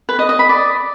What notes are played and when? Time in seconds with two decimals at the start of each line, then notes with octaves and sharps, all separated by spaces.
0.09 B4
0.19 D#5
0.29 D#5
0.39 B5
0.49 D5